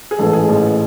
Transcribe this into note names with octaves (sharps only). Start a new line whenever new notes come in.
G#4
A1 G#2 E3 A4
G#4
A1 G#2 E3